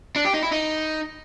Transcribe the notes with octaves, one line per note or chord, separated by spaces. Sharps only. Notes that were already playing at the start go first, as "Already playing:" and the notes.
D4
G4
D#4
E4
D#4